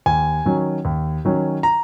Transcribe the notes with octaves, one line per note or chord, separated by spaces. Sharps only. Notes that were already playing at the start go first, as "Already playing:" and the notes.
D#2 G#5
D#3 F#3 C#4
D#2
D#3 F#3 C#4
A#5